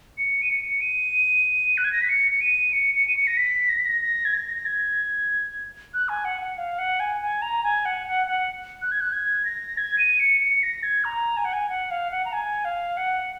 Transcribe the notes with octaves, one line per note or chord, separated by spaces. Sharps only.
C#7
D#7
C#7
D#7
F#6
G#6
A#6
B6
C#7
C#7
D#7
C#7
C#7
D#7
C#7
A#6
B6
A#6
B6
A#6
A#6
G#6
A#6
A#6
G#6
F#6
G#5
F#5
F#5
F5
F#5
G#5
G#5
A#5
G#5
F#5
F#5
F#5
F#6
G#6
F#6
G#6
A#6
G#6
D#7
C#7
C#7
A#6
G#6
A#5
G#5
F#5
G#5
F#5
F5
F#5
A#5
G#5
F5
F#5